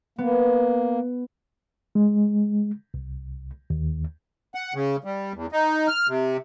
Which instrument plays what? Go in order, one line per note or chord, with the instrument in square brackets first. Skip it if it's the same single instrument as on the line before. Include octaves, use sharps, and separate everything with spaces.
[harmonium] A#3 [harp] B3
[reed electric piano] G#3
C2
D#2
[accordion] F#5
C#3
G3
E2
D#4
F6
C3